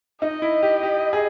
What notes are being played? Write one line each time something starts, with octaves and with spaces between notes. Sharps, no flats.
D#4 D#5
E4
G4
G4
G#4